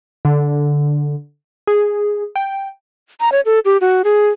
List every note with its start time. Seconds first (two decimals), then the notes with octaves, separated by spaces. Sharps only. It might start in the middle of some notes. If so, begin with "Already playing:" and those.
0.25 D3
1.67 G#4
2.36 G5
3.21 A#5
3.32 C#5
3.46 A4
3.65 G4
3.81 F#4
4.04 G#4